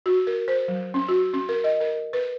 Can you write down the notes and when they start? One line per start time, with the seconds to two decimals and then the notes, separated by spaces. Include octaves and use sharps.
0.06 F#4
0.27 A#4
0.48 C5
0.68 F#3
0.94 C#4
1.08 F#4
1.33 C#4
1.49 A#4
1.64 D#5
1.80 A#4
2.13 B4